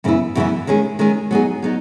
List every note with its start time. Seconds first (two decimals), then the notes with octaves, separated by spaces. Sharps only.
0.04 F#2 C#3 E3 B3 E4
0.35 F#2 C#3 E3 B3 E4
0.67 D#3 G#3 C#4 G#4
0.99 D#3 G#3 C#4 G#4
1.31 F#3 B3 D#4 G#4
1.62 F#3 B3 D#4